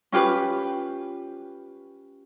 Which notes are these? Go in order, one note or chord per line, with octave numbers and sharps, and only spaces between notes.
C#4 F4 G4 B4